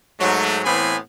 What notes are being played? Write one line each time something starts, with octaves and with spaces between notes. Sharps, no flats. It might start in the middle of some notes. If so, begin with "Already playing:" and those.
G#2 F#3 A3
A2 E3 B3 C4 G#5 B5